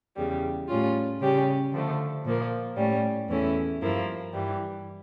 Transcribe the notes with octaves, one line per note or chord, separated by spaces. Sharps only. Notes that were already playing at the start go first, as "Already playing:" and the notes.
E2 C#3 G3
A2 G3 C#4 F4
C#3 G3 C#4 G4
D3 F3 A3
A#2 F3 A#3
A2 G3 C#4
E2 E3 A3 C#4 E4
G2 F3 A#3 E4
G2 E3 G3